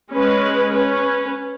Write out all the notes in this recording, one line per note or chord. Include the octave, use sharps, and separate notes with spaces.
G#3 C#4 B4
C#4 B4